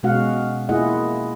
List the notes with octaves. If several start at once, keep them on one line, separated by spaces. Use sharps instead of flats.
B2 G#3 C#4 F#4 F5 F#5
A#3 E4 F4 G#4 D#5 F#5